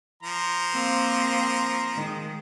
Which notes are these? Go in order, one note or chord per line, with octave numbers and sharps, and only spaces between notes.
F3 A#5 C6
A#3 C4
D#3 G#3